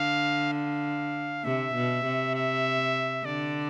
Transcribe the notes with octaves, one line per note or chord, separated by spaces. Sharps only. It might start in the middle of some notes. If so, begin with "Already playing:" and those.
Already playing: D3 F5
F5
C3 E5
B2
C3
E5
D3 D5